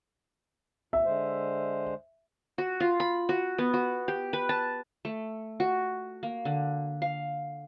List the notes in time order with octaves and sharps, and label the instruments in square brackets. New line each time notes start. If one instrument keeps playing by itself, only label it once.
[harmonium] A#2 [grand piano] E5
[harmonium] D3 G#3 C5
[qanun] F#4
F4
B5
F#4
B3
F#4
G4
B4
A5
A3
F#4
A#3
D3
F5